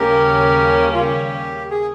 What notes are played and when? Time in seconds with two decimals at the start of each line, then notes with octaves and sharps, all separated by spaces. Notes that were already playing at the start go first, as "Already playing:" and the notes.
Already playing: D#2 C#3 G3 A#3 C#4 G4 A#4
0.94 F4
0.99 G4
1.71 G#4